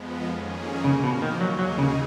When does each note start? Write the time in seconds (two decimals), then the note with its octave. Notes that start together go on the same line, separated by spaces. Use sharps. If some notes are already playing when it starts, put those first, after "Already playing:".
Already playing: F2 F3 G#3 B3
0.28 F2 D#3 A#3 C#4 G#4
0.84 A#2 C#3 F3 A#3
1.04 B2
1.22 D#3
1.40 D#2 D#3 F#3 A#3 D#4 G#4
1.59 F#3
1.78 C#3